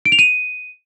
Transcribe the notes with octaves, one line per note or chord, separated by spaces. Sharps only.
D7
F7
D#7